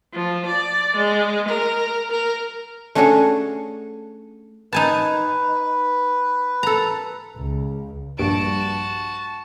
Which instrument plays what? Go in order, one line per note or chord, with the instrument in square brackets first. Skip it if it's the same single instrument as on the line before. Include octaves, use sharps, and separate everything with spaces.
[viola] F3
D5
G#3
A#4
A#4
[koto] A3 C#4 D4 F#4 G#4 A4
[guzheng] D#4 G#5 A5 [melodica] B4
[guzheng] A4 A#5
[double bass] C#2
[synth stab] A#1 G2 D7 [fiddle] F#4 A5